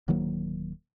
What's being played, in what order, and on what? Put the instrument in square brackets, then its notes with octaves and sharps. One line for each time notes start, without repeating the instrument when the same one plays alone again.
[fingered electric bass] D1 D#3 F#3 A#3